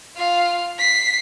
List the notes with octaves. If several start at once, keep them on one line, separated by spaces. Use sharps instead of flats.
F4 F5
B6 C7